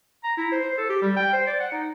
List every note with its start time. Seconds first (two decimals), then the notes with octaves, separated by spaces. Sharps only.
0.24 A#5
0.37 E4
0.52 C5
0.64 C5
0.78 A4
0.89 G4
1.02 G3
1.16 G5
1.33 C5
1.47 D5
1.60 F#5
1.72 D#4